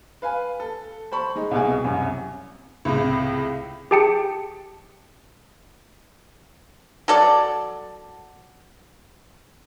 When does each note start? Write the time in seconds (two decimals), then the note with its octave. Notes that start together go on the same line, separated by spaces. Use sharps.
0.22 B4 F5 G#5
0.60 A4
1.12 C5 A5 B5 C#6
1.35 G#3 D#4
1.51 C2 B2 G#4
1.84 C2 F#2
2.85 C#2 A2 C3
3.91 G4 G#4 G5 A5 C#7
7.08 F#3 A4 D5 A5